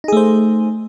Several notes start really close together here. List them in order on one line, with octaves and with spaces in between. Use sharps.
D#4 G#4 A3 C5